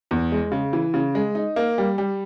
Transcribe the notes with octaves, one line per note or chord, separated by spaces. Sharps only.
E2
G#3
C#3
E3
C#3
G#3
D#4
A#3
G3
G3